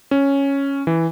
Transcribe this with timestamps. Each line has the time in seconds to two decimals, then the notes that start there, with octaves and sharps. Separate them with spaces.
0.11 C#4
0.87 E3